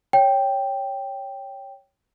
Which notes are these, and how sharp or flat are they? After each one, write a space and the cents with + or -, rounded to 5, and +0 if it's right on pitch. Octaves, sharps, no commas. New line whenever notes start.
C#5 +0 G5 +0